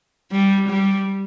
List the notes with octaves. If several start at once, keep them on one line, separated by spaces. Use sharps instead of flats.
G3
G3